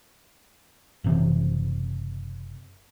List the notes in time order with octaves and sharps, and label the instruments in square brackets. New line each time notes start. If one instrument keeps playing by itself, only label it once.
[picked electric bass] F#1 C3 E3